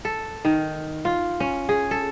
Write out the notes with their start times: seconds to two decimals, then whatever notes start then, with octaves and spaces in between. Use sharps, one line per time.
0.05 A4
0.45 D#3
1.05 F4
1.40 C#4
1.69 G#4
1.91 A4